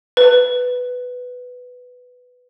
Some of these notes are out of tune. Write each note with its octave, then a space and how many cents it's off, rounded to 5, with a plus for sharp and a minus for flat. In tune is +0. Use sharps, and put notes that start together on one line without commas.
B4 +5